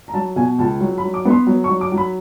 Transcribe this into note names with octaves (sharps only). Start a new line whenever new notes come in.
A#5
F#3 A5
B2 G#5
C#2 A5
F#3
B5
F#3
D6
B3 C6
F#3
C#6
F#3
D6
F#3
B5